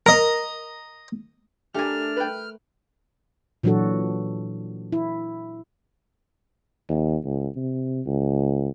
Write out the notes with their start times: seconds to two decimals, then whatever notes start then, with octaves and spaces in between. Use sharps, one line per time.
0.06 A#4 D#5 A#5
1.74 A3 D4 G4 A#4 G#5 F6
2.17 B4 G5
3.63 A#2 E3 F#3 D4 F#4 A4
4.92 E4
6.89 D#2
7.25 C#2
7.56 C3
8.06 C#2